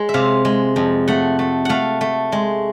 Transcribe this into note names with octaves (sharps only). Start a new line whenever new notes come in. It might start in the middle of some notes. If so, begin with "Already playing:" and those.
Already playing: G#3
E5
C3 F5
G#3
F2
A3 F#5
A3
A3 F5 F#5
A3
G#3